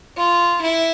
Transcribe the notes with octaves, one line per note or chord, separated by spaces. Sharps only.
F4
E4